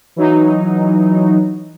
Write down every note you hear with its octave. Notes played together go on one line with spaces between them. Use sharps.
E3 F#3 D#4